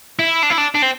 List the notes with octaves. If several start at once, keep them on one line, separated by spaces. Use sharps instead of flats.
E4
D4
E4
D4
D4
C4